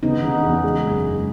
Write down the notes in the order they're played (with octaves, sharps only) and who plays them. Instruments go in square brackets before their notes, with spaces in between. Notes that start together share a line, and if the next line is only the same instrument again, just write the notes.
[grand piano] C#3 [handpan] B3 D#4
[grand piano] C#3
E2
G#3
F#1
G#3